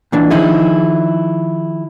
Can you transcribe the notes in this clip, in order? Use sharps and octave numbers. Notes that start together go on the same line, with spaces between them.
A#2 E3 D4
D#3 F3 D#4 E4 G#4